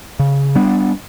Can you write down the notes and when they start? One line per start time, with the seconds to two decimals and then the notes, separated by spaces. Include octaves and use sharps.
0.19 C#3
0.55 G3 B3 D4